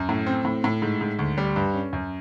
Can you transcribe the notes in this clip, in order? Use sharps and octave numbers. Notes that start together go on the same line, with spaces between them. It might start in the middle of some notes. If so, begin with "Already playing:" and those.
Already playing: F#2
A2
C4
A2
A2
G#2
G#2
D2
G3
G2
C#4
F#2